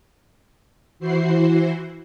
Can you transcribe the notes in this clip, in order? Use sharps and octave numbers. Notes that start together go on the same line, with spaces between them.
E3 E4 F#4 C5 C7